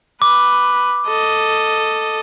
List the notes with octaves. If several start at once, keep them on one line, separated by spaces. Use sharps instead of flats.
B4 D6
A4 D#5